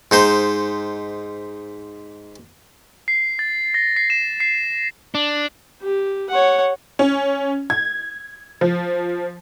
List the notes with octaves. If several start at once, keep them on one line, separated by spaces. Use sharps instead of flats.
G#2 D#4 C5
C7
A6
A#6
C7
E7
C7
D4
G4
C#5 F#5
C#4
G#6
F3